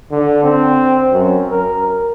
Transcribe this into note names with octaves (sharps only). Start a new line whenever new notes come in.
D3
C4
F#2
A#4